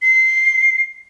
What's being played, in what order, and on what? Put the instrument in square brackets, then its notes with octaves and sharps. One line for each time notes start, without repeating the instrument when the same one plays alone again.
[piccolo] C7